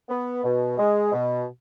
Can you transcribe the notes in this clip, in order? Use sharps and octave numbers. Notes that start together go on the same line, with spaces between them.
B3
B2
G#3
B2